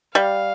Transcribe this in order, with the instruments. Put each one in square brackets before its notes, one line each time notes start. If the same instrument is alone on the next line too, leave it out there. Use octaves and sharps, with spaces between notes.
[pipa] G3 [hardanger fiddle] F5